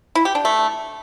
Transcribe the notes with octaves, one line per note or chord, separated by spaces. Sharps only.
E4
G4
D4
A3